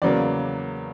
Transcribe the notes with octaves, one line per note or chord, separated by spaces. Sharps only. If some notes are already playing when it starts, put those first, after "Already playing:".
E2 C#3 F#3 A#3 D5